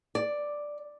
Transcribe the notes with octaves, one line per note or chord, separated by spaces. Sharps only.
D5